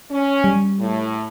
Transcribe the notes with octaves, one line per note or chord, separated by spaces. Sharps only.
C#4
G3
A2